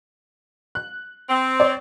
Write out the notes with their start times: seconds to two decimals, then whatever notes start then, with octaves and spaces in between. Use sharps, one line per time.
0.75 F#6
1.29 C4
1.60 C#5 D5